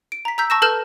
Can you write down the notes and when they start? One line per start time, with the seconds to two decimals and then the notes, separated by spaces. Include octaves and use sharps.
0.12 D7
0.25 A#5 B6
0.38 A#5 E6 G6 B6
0.50 A5 C#6 E6 A#6 E7
0.62 A4 B4 A5 F6 G6 E7